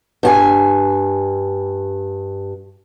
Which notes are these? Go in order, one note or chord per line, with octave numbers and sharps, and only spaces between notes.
G2 G4 G#5